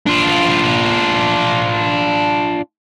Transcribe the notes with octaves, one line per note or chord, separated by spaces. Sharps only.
D4 F4